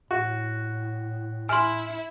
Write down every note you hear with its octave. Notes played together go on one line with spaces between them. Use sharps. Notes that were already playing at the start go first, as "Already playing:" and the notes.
A2 F#4
E4 G#5 C6 F6